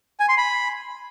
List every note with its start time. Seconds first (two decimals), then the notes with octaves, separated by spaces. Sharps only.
0.20 G#5
0.29 C6
0.37 B5